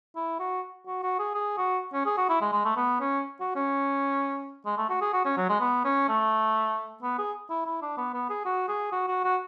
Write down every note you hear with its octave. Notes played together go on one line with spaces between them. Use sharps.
E4
F#4
F#4
F#4
G#4
G#4
F#4
C#4
G#4
F#4
E4
G#3
G#3
A3
B3
C#4
F#4
C#4
G#3
A3
F#4
G#4
F#4
C#4
F#3
G#3
B3
C#4
A3
B3
G#4
E4
E4
D4
B3
B3
G#4
F#4
G#4
F#4
F#4
F#4